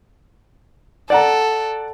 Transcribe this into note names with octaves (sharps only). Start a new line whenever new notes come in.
A4 D5 F#5 A#5